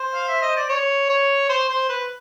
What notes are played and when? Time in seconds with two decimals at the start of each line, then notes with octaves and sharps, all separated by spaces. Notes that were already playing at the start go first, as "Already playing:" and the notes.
Already playing: C5
0.14 F5
0.28 E5
0.42 D#5
0.56 D5
0.69 C#5
1.09 C#5
1.49 C5
1.69 C5
1.89 B4